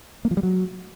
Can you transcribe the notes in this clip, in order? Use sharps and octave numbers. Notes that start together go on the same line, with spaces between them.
A#3
F3
G3
F#3